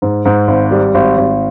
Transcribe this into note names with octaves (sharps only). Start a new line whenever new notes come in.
G#2
G#2
G#1
G3
G#1
G#1